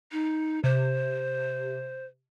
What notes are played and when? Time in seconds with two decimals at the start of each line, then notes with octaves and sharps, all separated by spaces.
0.12 D#4
0.64 C3 C5